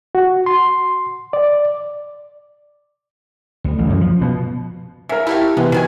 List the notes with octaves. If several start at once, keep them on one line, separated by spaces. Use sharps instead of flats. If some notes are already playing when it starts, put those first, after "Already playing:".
F#4
C6
D5
D2
A1
F#2
F3
B2
C#3 A#4 E5
A3 E4 G4 F5
C3 E3 G#3 B3 C4
B2 D#3 F4 G#5